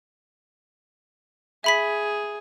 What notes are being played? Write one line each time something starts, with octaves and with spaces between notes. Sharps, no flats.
G#4 E5 B5 B6